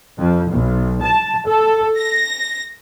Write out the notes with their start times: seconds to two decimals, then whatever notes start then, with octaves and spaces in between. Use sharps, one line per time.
0.18 F2
0.51 B1
1.02 A5
1.47 A4
1.98 A#6